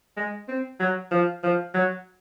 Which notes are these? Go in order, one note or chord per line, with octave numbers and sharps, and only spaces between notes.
G#3
C4
F#3
F3
F3
F#3